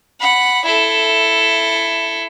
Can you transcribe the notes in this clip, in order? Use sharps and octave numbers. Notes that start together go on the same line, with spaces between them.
F#5 B5
E4 A4